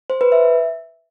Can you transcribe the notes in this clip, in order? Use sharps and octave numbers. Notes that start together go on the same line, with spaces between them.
C5
B4
E5